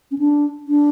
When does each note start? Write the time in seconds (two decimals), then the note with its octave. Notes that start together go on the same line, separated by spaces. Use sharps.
0.11 C#4
0.19 D4
0.68 D4